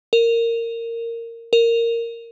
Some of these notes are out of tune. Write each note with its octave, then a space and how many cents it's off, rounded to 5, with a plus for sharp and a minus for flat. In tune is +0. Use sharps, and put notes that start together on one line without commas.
A#4 -15
A#4 -10